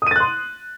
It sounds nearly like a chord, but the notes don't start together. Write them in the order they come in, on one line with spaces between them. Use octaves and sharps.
D#6 D#7 A6 F#6 C6